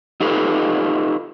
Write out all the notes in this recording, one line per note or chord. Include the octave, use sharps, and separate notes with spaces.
D#4 F4 G4 A4 B4